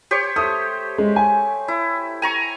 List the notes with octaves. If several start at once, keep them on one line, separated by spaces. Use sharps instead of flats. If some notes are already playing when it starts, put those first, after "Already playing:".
G4 C5 C#5
A3 D#6
G#3
G#5
E4
G#5 A#5 C#6